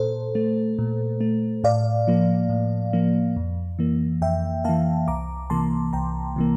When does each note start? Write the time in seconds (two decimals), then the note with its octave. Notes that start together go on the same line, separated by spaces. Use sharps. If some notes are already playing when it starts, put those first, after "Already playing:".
Already playing: A#2 A4 C5
0.35 A3
0.79 A#2
1.21 A3
1.64 A2 D5 F5
2.08 F3 A#3
2.49 A2
2.93 F3 A#3
3.36 F2
3.79 E3 A#3
4.22 F2 E5 G5
4.64 E3 A#3 F5 A5
5.08 C2 A#5 D6
5.50 C3 E3 A#3 A5 C6
5.93 C2 G5 A#5
6.36 C3 E3 A#3